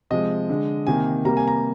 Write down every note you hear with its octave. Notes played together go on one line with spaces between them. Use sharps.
C3 F3 G#3 D#5
D3 G#3
C3 D#3 A#3 G#5
C3 G3 A#3 A#5
G#5
A#5